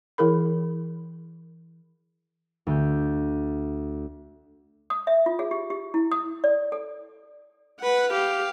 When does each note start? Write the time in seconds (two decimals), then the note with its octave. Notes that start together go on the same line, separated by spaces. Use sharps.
0.18 E3 E4 G#4 A#4 B5
2.67 D2 G6
4.90 D#6
5.07 E5
5.26 F4
5.39 G#4
5.51 G4
5.70 G4
5.94 E4
6.12 D#6
6.44 D5
6.72 A4
7.81 B4 F#5
8.11 G4 F5